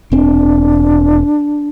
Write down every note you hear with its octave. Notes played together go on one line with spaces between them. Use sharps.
E1 C4 D4